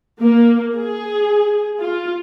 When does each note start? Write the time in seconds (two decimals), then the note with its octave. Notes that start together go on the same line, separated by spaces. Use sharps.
0.20 A#3
0.76 G#4
1.81 F4